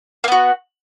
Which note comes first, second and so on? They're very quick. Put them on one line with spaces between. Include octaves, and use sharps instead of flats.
A#3 B3 F#4